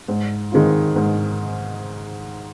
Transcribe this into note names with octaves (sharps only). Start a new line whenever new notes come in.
G#2
D#3 G#3 C4 F4
G#2